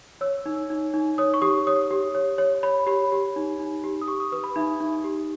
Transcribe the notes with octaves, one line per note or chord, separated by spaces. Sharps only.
C#5 E6
D#4
D#4
D#4
C#5 D#6
C#6
G4 D#6
C#5 D#6
G4
C#5
C#5
C#5 B5
G4 B5
G4
D#4
D#4
G4
D#6
G4 C#6
D#6
B4 D#6
B5
D#4 E5
D#4
G4